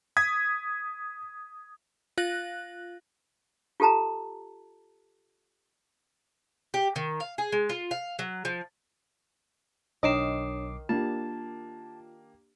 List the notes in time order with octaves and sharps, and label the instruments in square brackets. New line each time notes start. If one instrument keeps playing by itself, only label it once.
[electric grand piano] D#6 G#6 B6
[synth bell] F4 F5 F#6 A#6 F#7
[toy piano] F4 G4 A4 A5 A#5
[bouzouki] G4
D#3
F5
G#4
G#3
F4
F5
F#3
F3
[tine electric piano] B1 D6 C7 [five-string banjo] D#3 D#5 [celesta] D4 C#5 E7
[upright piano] A#3 D4 G4 [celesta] F4 [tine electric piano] A5